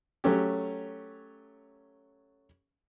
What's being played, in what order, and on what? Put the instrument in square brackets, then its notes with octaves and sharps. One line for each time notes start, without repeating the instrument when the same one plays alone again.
[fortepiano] F#3 A3 C#4 G4